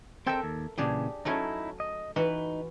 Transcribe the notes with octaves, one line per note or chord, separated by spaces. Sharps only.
C4 A4 A#4 C5 E5 G5
D#2
A#2 C#3 E3 D4 G4 G#4
F#3 A3 C#4 D#4 E4
D#5
E3 D#4 F#4 B4